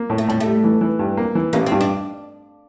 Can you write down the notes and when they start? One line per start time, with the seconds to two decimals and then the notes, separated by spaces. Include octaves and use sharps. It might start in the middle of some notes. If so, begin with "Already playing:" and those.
Already playing: A#3
0.10 A2
0.18 A3
0.28 A2 G3
0.40 G3 A3
0.64 E3
0.81 E3
0.99 G2
1.17 A#3
1.35 E3
1.53 A1 A#3
1.66 C4
1.72 G2
1.81 D4